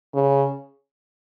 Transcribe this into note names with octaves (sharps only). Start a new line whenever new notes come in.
C#3